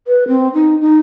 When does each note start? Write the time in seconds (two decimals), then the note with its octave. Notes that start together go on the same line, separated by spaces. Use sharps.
0.07 B4
0.28 C4
0.54 D#4
0.81 D#4